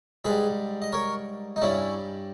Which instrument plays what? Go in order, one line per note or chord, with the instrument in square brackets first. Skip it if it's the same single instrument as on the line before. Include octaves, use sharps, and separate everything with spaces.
[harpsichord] G#2 G3 G#4 B4
D#5
A#4 C#5
D#4
G2 G3 C#4 E4